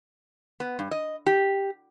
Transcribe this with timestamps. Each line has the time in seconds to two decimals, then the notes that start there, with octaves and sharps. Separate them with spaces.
0.60 B3
0.79 G2
0.91 D#5
1.26 G4